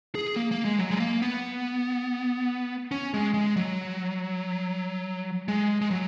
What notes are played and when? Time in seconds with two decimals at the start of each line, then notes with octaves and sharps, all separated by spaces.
0.15 G#4
0.36 A#3
0.51 A#3
0.65 G#3
0.79 F#3
0.90 G#3
1.00 A#3
1.22 B3
2.91 C#4
3.14 G#3
3.34 G#3
3.56 F#3
5.48 G#3
5.81 G#3
5.91 F#3